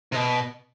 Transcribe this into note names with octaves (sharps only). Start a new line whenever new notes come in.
C3
B2